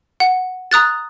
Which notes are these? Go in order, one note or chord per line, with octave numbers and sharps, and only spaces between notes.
F#5
A#5 D#6 F#6 A6